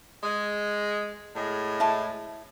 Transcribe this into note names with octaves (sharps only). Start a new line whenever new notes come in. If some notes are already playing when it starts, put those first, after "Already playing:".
G#3
A2 G#3
E4 A5